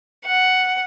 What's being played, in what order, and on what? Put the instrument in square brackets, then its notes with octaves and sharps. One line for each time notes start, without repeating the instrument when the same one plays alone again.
[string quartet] F#5